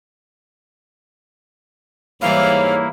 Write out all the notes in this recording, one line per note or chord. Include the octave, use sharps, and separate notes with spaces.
G#2 E3 G3 A#3 E4 C#5 F5